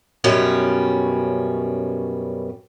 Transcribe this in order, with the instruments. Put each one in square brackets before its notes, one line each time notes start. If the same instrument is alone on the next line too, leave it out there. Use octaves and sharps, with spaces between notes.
[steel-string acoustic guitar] F#2 B2 G3 C#4